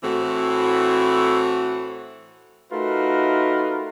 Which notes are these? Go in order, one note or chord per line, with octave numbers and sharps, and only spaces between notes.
A2 E3 A3 C4 F#4
A3 D#4 F4 F#4 A#4 B4